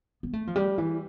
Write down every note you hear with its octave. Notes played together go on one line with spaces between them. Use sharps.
B3
A3
F3
G3
E3